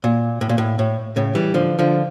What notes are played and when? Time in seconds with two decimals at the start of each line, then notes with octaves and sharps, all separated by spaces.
0.04 A#2
0.41 A2
0.49 A#2
0.58 A2
0.79 A2
1.16 A2 C#3
1.35 E3 G3
1.54 D3 F3
1.79 D3 F3